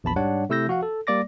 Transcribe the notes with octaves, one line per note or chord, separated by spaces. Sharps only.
A#1 E2 A5 B5
G#2 G3 D4 C#5 F#5
C3 A3 E4 E6 G6 A#6
F3 F#4 F5 F#5
A4
G3 A#3 D5 D6 A#6